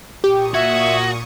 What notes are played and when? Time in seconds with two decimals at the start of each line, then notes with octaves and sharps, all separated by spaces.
0.24 A#2 G4 C#6 D#6
0.54 F#4 E5 G#6